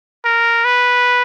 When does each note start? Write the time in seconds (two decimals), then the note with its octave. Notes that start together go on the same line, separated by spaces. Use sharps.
0.25 A#4
0.65 B4